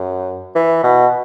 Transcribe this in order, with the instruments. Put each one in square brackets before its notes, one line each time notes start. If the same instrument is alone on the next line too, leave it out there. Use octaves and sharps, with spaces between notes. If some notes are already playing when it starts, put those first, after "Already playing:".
Already playing: [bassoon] F#2
E3
B2